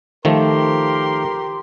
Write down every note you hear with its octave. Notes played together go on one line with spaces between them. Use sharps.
D#3 F3 A3 G4 A#4 C6